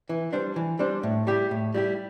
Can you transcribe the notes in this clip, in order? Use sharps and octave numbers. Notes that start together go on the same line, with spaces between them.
E3
G3 D4 C5
E3
G3 D4 C5
A2
G3 E4 G4
A2
G3 E4 G4